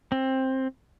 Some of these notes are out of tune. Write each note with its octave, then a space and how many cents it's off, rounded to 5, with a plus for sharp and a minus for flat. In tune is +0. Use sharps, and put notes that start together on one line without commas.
C4 +15